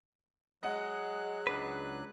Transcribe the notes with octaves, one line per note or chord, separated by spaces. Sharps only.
F#3 G#3 D#5 F#5 F#6
C#2 D4 B4